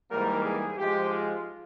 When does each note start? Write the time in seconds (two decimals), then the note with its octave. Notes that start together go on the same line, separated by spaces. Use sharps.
0.10 G#2 E3 G3 A#3 A#4
0.44 G#4
0.78 G#2 F3 G#3 G4
1.11 F4